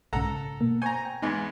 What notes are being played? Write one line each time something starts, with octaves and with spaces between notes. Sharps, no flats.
B1 G#2 C#3 A4 F#5 A#5
B2 A#3
C5 G#5 A#5 C#6 G6
G5
E2 G#2 G#3 D#4 B5